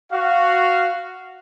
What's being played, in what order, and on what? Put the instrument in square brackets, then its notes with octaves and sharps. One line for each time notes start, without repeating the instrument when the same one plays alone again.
[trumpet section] F#4 F5